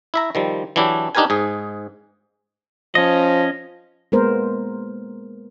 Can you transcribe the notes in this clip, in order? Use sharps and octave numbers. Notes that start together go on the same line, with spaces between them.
E4 E5 A#5
D#3 F3 G3
E3 F#3 D4 E4 G4
D4 D#4 G4 A#4 B4 G#5
G#2 G#4
F3 C#4 D#5
G#3 A#3 B3 A#4 C5